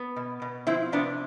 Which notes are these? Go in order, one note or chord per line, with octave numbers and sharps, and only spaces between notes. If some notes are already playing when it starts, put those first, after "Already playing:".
Already playing: B3
B2
B2
F3 C4 E4
C3 B3 D4